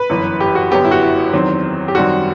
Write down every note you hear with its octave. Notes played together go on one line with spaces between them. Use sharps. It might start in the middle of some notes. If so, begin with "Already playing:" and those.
Already playing: B4
G1 F#2 E3
G4
F#4
G1 F#2 F#3 B3 G4
E4
F#4
E4
E2 D#3 F#3 C4
G4
F#2 D#3 G3 C4 F#4